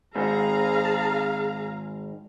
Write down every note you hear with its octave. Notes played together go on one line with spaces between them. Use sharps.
G#2 D#3 G#4 F5 A#5